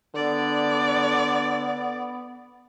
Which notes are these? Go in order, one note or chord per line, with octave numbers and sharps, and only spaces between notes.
D3 B3 D5